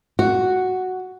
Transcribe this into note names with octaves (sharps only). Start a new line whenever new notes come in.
F#4